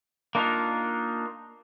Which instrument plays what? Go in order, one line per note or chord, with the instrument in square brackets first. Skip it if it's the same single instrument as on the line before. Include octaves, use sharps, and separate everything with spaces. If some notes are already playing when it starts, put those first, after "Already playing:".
[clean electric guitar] A#3 D4 D#4 F4 A#4